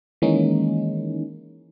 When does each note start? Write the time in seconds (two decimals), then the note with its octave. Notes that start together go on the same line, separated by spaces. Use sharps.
0.22 D#3 E3 G#3 A#3 C#4 D#4